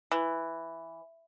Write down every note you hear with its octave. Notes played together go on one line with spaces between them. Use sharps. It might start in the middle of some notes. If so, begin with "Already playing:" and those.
E3